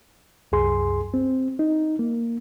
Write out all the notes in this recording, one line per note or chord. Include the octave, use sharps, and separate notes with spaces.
C2 F#2 G#4 C6
C4
D#4
A#3